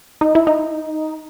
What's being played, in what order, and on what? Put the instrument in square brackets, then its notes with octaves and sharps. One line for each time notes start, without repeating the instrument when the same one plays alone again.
[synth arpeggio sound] D#4
E4
D#4